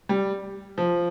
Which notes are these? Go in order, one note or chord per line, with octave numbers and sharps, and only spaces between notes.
G3
F3